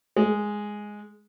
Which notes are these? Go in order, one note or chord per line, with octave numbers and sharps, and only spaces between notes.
G#3